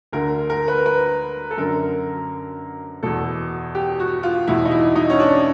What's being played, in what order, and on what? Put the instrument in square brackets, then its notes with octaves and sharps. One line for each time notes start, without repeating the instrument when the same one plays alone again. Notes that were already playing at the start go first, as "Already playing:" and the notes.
[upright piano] D2 D3 A#4
A#4
B4
B4
A4
F#2 D3 A#4
E2 B2 A4
G4
F#4
F4
E2 B2 E4
D#4
E4
D#4
C#4
D4